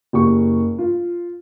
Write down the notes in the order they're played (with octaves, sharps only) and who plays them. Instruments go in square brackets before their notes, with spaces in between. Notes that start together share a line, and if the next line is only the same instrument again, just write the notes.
[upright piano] F#1 G4 C#6
F4